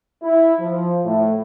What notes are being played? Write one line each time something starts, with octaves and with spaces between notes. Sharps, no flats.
E4
F3
A2